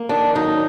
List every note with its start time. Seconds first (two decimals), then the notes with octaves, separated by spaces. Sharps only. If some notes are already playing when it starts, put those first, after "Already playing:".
Already playing: A#3
0.09 D#3 D4
0.35 F#3 D#4